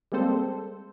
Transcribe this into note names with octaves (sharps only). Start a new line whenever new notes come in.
G3 G#3 A#3 C4 A4 C5